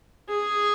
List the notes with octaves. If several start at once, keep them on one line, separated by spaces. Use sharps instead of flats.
G#4